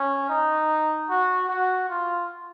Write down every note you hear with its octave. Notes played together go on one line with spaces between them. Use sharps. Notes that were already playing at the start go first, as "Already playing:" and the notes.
Already playing: C#4
D#4
F#4
F#4
F4